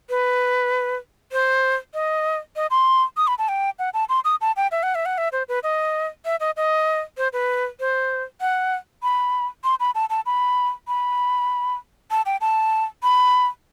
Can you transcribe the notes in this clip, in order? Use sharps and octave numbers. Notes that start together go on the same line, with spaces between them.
B4
C5
D#5
D#5
C6
D#6
B5
A5
G5
F#5
A5
C6
D#6
A5
G5
E5
F#5
E5
F#5
E5
C5
B4
D#5
E5
D#5
D#5
C5
B4
C5
F#5
B5
C6
B5
A5
A5
B5
B5
A5
G5
A5
B5